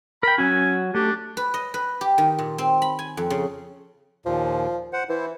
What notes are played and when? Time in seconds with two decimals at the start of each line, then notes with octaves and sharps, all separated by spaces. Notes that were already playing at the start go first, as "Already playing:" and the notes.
0.23 A#4 G5 B5
0.38 F#3 C#4 F#4 G#5
0.95 A3 D4 G4
1.37 B4
1.54 D#5
1.74 B4
2.01 G4
2.18 D#3
2.39 A#2
2.58 C4
2.82 B5
2.99 G#5
3.17 F2
3.30 C#3
4.26 D#2 A#2 F3
4.93 C5 F#5
5.09 E3 E4 C5